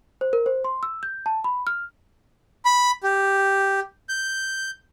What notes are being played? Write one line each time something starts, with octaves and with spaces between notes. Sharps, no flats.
C5
A#4
C5
C6
E6
G6
A5
B5
F6
B5
G4
G6